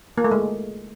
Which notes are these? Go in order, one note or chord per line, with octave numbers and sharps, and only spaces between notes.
A#3
A3
G#3